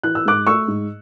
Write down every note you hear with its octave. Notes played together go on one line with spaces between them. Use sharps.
E3 F#6
E6
G#2 D6 F#6
A3 C#6 E6
G#2